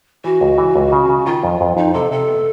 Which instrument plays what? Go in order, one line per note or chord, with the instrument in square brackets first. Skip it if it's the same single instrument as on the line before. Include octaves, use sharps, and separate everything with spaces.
[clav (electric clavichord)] E3 [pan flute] F#4
[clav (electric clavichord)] C#2
E3
C#2
C#3
C#3
[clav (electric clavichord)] D#3 [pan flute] F4
[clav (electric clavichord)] F2
F2
[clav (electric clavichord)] F2 [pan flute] D#4
[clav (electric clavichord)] C3 [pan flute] A4
[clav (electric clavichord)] C3 [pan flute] A4
[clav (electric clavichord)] B3